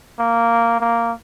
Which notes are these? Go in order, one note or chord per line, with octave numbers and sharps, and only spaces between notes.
A#3
A#3